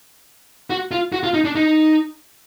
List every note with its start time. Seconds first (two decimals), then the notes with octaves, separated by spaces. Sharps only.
0.70 F#4
0.91 F4
1.12 F#4
1.23 F4
1.34 D#4
1.45 D4
1.55 D#4